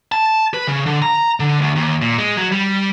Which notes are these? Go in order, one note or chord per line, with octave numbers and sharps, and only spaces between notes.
A5
B4
C#3
D3
A#5
D3
D2
D#2
A#2
G#3
F#3
G3